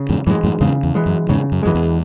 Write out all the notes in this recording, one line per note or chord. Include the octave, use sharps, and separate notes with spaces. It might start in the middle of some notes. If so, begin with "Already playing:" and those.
Already playing: C#3
E2 G#2
F#2 A2 E3 G#3
F#2 A2
E2 G#2 C#3
E2
E3 G#3
F#2
E2 G#2 C#3
F#2
F#2 E3 G#3
E2